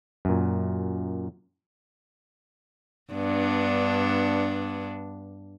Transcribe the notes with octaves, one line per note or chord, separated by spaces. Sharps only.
F#2 A#2
G2 B3 D4